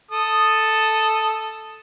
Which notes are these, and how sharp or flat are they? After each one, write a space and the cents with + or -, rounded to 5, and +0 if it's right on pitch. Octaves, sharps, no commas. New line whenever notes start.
A4 +0 D#6 +0